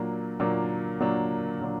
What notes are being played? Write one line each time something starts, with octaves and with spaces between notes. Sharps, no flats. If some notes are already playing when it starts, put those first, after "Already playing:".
Already playing: A#2 F#3 A#3 D4
A#2 F#3 A#3 D4
A#2 F#3 A#3 D4
A#2 F#3 A#3 D4